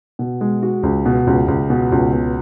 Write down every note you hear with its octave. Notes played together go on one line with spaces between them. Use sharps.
B2
G#3
F#4
C#2
B2
C#2
C#2
B2
C#2
B2